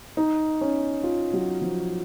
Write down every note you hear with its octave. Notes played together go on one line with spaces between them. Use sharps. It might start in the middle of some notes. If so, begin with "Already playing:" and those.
D#4
C#4
F4
F#3
F3